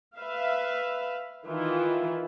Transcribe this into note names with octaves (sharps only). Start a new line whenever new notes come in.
B4 E5 F5
D#3 E3 E4 F4